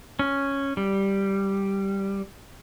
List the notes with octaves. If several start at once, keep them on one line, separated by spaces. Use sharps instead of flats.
C#4
G3